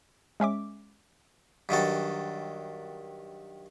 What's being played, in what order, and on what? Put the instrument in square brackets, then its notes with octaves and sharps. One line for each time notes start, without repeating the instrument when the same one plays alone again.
[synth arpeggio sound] G#3 C#4 E5 D6
[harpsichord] G2 D#3 F#3 A4